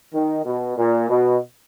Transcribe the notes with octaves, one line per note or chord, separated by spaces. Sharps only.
D#3
B2
A#2
B2